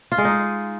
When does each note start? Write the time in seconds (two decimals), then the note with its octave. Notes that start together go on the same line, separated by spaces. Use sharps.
0.12 F4
0.18 G#3
0.25 D#4